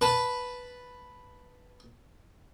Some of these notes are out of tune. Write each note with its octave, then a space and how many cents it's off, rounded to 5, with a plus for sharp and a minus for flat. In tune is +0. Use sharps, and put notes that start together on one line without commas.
B4 +0 A5 +0